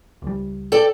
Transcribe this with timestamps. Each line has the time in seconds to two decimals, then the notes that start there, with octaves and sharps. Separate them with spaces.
0.22 C#2 G3
0.72 A4 D5 G5